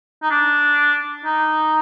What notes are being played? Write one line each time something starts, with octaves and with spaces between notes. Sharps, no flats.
D#4
D4
D#4